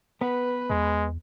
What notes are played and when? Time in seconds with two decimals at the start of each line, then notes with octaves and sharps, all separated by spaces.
0.21 B3 B4
0.70 E2 G#3